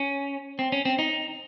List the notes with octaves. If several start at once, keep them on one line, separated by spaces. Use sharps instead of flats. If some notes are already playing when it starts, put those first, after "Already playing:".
Already playing: C#4
C4
C#4
C4
D#4